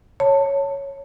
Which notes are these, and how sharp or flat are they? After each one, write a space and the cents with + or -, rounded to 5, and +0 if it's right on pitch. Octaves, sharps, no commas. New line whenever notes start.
C#5 +0 A5 +20